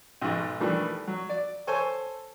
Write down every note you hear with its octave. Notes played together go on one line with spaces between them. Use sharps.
B1 G#2
D#3 E3 G3 A3 D4
F#3
D5
A4 C5 C#5 G#5 C#6